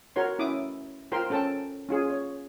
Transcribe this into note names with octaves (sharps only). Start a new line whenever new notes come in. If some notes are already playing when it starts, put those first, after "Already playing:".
F#4 A#4 C#5 C6
C#4 E4 D6 D#6
F4 A#4 C5 G5 C6
C#4 A4 G5 A5
C#4 F4 G#4
C#5